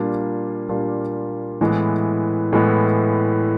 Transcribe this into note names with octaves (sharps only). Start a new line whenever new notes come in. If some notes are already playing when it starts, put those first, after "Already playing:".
Already playing: A#2 G3 A#3 D4 F4
A#2 G3 A#3 D4 F4
A2 E3 G#3 B3
A2 E3 G#3 B3